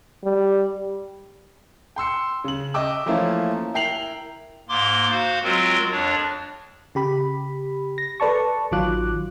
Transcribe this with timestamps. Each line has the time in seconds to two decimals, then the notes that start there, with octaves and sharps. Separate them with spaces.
0.24 G3
1.96 G5 C6 E6 C#7
2.44 C#3 F#7
2.74 D#5 E5 G5 D6 E6
3.06 E3 F3 A3 A#3 C#4 E4
3.74 E4 A#4 G5 C7 F7 F#7
4.69 G#2 A#3 C6 D6
5.11 F#4 C5 F5
5.43 F#3 G#3 C4 F4 F#4 A#4
5.91 F2 D4 C#5
6.95 C#3 G4 B5
7.98 A#6
8.20 A4 B4 D5 A5 C#6
8.71 A1 D#3 F#3 F4 D6 F#6